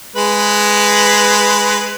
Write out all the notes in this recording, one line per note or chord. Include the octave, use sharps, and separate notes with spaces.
G#3 B4